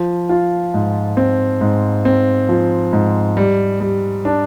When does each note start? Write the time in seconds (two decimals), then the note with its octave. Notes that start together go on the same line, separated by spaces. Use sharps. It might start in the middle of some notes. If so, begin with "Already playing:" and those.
Already playing: F3
0.29 F4
0.74 G#2
1.17 C4
1.61 G#2
2.05 C4
2.49 F3
2.93 G#2
3.37 G3
3.81 G3
4.25 D4